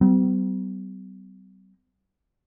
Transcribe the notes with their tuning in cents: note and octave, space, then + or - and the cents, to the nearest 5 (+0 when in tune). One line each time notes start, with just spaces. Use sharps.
G3 -40 B3 +45